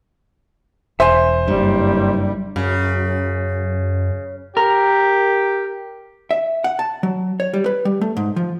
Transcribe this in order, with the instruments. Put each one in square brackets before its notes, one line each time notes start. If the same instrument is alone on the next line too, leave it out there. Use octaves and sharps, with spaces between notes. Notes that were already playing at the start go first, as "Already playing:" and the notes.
[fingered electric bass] E1 [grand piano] C5 [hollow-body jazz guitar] E5 G#5
[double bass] F#1 G3 [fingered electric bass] G2
[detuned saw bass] F#2 [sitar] C#3
[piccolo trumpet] G4 [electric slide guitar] A#4
[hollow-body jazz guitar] E5
F#5
A5
F#3
C#5
G3
B4
G3
A3
G#2
F3